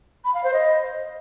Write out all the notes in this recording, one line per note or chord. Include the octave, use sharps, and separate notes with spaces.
B5
F5
C5
D#5